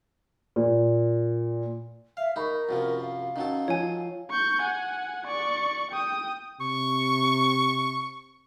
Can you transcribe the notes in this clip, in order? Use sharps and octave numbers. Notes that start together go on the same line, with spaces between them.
A#2
E5 F5
D#4 A#4 A#5 B5 C#6
F#2 C3 F3
F5
D#3 F#3 C#4 A4
F3 C#5 G#5
C#6 G6
F#5 G#5
D5 C#6
G5 D#6
C3 C#6